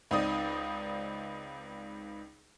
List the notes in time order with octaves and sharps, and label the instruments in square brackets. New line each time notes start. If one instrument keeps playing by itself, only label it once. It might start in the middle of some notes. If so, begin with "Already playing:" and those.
[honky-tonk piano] C#2 C4 D#4 D5 D#6